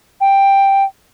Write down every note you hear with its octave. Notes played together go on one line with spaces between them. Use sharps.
G5